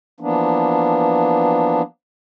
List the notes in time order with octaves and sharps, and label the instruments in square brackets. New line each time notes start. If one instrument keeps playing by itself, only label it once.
[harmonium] E3 F3 A#3 B3 D4